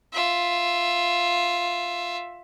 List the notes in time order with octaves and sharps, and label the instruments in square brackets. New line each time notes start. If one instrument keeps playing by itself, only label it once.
[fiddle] F4 E5